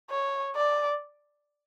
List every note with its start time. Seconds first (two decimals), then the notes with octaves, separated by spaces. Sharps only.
0.11 C#5
0.56 D5